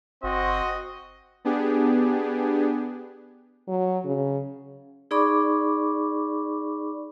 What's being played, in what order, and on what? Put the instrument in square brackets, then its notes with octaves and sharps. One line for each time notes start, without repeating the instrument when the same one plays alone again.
[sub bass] G1 [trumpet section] C4 C5 [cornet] F#4 [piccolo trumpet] D#5
[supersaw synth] B3 D4 G4 G#4
[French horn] F#3
C#3
[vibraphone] D#4 G#4 D5 B5 C#6 D6